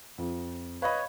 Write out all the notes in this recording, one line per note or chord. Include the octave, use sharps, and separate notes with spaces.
F2
B4 C#5 D#5 F5 B5